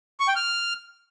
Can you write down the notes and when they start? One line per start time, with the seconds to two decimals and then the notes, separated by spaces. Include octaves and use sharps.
0.20 C#6
0.28 G5
0.36 F6